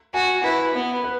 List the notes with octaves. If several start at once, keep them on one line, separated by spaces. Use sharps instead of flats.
F#4 G#5
E4 B4
B3
B4